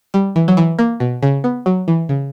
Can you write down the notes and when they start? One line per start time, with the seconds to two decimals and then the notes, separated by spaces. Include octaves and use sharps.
0.14 G3
0.36 E3
0.48 F#3
0.57 E3
0.79 A#3
1.00 B2
1.23 C#3
1.44 B3
1.66 F#3
1.88 E3
2.09 C#3